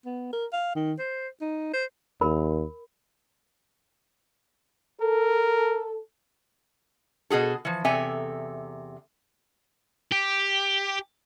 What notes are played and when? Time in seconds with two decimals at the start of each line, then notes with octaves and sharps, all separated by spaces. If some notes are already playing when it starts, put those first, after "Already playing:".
0.06 B3
0.33 A#4
0.53 F5
0.75 D#3
0.99 C5
1.41 D#4
1.73 C5
2.21 D#2 A#4 B5
5.01 A4 A#4
7.30 B2 F#4 G#4 A4
7.65 E3 F3
7.85 E2 C3 A4 E5 G#5
10.12 G4